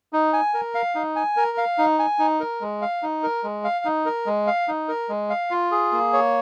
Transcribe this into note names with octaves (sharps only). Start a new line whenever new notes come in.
D#4
G#5
A#4
F5
D#4
G#5
A#4
F5
D#4
G#5
D#4
A#4
G#3
F5
D#4
A#4
G#3
F5
D#4
A#4
G#3
F5
D#4
A#4
G#3
F5
F4
G#4
A#3
C#5